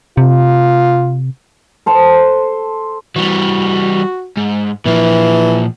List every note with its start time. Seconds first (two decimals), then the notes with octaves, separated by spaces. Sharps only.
0.17 C3 F4
1.86 A4 C5 A5
3.16 E3 G3 F#4
4.37 G#2
4.86 A#2 E3 F3